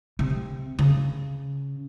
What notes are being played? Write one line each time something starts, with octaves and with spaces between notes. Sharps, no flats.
C3
C#3